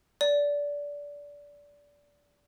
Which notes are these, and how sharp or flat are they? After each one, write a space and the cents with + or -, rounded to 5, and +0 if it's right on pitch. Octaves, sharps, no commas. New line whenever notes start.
D5 -20